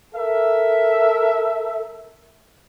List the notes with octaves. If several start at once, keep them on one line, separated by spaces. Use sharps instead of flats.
A4 A#4 E5